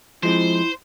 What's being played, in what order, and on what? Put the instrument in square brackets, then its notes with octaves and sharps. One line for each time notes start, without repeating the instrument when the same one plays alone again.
[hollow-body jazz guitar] F3 G#3 C4 [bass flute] E4 [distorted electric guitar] C5